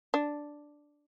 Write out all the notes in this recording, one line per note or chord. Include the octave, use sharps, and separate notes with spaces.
D4